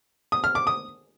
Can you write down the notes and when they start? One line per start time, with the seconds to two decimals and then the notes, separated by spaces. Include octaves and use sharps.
0.32 D#6
0.44 F6
0.55 D6
0.67 D#6